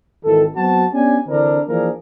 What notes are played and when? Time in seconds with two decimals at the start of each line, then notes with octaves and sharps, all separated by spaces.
0.24 G#1 D#3 E3 A4
0.55 F#3 B3 C4 F#4 A5
0.92 B3 C#4 D4 G4 G#5
1.27 D3 E3 C4 D4 E4 A#4
1.67 E3 F3 A#3 D4 G#4 A#4